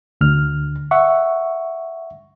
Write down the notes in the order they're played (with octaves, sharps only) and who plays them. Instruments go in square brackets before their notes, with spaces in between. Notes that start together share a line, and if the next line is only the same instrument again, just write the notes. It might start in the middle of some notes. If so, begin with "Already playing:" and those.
[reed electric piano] D2 D3 F6
E5 F#5 C#6